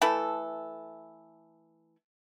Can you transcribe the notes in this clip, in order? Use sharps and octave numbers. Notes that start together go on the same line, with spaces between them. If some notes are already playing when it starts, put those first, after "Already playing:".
E3 A3 E4 A4